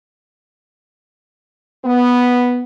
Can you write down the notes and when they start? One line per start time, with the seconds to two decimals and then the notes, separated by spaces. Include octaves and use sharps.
1.85 B3